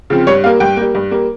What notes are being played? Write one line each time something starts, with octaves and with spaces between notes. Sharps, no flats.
C#3 F3 C4
G2 C#5
G3 A#3 F5
G2 G5
G3 A#3
G2
G3 A#3